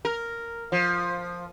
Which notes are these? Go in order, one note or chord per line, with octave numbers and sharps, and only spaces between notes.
A#4
F3